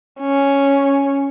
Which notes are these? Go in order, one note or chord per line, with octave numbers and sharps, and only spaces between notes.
C#4